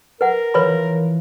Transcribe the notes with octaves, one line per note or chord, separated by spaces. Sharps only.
A#4 B4 F#5
E3 F3 B4 C#5 B5